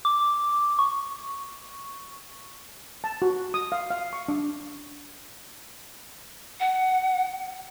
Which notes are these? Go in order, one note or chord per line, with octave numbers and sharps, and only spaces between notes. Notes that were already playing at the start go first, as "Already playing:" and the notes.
D6
C#6
A5
F#4
D#6
F5
F5
C#6
D4
F#5